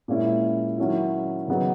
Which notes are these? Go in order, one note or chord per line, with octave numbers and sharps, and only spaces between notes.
A#2 G#3 C#4 E4
D#3 F#3 C#4 E4
C#3 F#3 B3 D#4